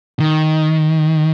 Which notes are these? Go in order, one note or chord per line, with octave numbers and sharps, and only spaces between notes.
D#3